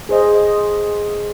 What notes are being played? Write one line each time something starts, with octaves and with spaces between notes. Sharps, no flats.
G#4 C5 D#5